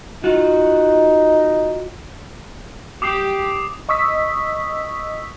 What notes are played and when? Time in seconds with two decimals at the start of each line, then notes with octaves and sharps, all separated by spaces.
0.24 D#4 F4 F#4
3.02 G4 D6 D#6 C7
3.89 D#5 C#6 D#6 E6 B6